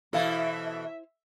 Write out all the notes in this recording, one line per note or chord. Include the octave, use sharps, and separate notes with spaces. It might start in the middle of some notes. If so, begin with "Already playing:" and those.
B2 E3 E4 A4 C5 E5 F5